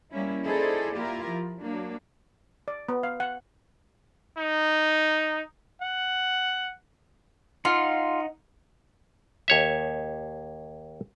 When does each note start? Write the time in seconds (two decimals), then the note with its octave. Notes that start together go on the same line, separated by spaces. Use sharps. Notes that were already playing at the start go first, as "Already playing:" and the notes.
0.11 G3 A#3 C#4 E4
0.45 D#4 E4 G#4 A4 C5 D5
0.96 A#3 E4 F4 G4 A#4
1.29 F3
1.61 F#3 A#3 D4
2.68 D5
2.89 B3
3.03 F5
3.20 F#5
4.37 D#4
5.81 F#5
7.65 D#4 F4 F#5
9.48 D#2 C#5 E5